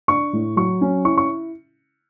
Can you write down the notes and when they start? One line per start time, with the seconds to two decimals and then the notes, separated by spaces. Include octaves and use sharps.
0.08 D4 C#6
0.33 A2
0.56 F#3 C#6
0.81 C#4
1.05 E4 C#6
1.18 C#6